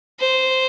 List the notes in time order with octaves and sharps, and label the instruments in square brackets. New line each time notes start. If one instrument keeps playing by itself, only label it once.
[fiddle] C5